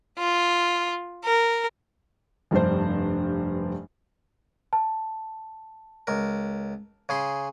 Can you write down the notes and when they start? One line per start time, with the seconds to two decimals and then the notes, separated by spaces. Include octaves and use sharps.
0.19 F4
1.25 A#4
2.51 F1 G2 G3 D4 C5
4.73 A5
6.07 C#2 A#4
7.09 C#3 G#4 C6